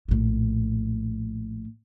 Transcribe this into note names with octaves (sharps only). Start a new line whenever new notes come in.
A#1 A2